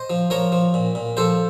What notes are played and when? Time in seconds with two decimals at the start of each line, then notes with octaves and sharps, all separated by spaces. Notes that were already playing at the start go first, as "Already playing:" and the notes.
Already playing: C5 D#5
0.10 F3
0.30 F3 A#4 C#5
0.52 F3
0.74 A#2
0.95 A#2
1.17 F3 A4 C5